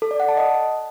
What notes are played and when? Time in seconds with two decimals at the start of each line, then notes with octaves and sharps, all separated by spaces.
0.02 A4
0.11 D5
0.20 F#5
0.29 A5
0.37 D#5